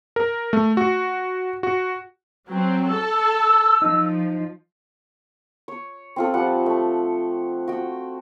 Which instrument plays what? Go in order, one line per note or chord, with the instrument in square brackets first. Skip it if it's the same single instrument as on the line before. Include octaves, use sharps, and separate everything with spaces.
[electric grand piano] A#4
A3
F#4
F#4
[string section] F#3 C4
[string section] A4 A5 [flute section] E6
[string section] F3 [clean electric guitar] D#4
[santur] C#5
C4 F4 A4
F3 G3 F#5
A3
F#4 G5